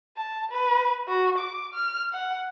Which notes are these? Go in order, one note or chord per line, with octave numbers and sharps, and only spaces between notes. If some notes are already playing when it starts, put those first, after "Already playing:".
A5
B4
F#4
D6
F6
F#5